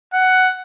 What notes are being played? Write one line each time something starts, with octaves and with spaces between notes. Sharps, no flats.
F#5